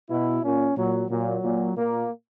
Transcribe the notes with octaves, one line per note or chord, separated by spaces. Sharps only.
B2 E4
A#2 C#4
A#2 F#3
A#2 F#3
A#2
A#2 A#3